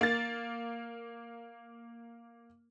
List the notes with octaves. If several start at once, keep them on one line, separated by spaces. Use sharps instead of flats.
A#3 A6